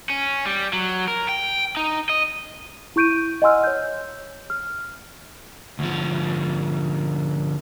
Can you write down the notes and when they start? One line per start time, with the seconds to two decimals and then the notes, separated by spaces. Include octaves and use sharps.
0.10 C#4
0.46 G3
0.73 F#3
1.08 A#4
1.29 G5
1.77 D#4
2.09 D#5
2.96 E4 C#6 G6 D7 D#7
3.42 D#5 F#5 G#5 C6 E6 F6
3.64 C#5 G6
4.50 F6
5.79 D2 F3